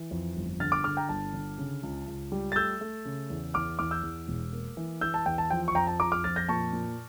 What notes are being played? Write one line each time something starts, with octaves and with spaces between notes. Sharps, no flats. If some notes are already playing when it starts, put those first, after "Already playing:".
Already playing: E3
F2
G1
D3 F6 A6
D6 F6
D3 D6 F6
G5 A#5
G1 A5
D3
C#3
C#2
C#2
G3
A6
A3 E6 G6
A3
C#3
E2
E2 D6 F6
E2 D6 F6
E6 G6
E2
E1
A#3
E3
E3 E6 G6
A5
E2 G5
A5
F3 G5
C#6
F2 G5 A#5
A5
F3 A#5 D6
D6 F6
F2 F6 A6
G6 A#6
A#2 A5 C#6
A#2